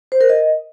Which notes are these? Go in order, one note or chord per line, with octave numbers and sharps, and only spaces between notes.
C5
A#4
D#5